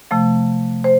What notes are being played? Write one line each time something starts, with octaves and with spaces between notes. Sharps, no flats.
C3 F3 A3
C5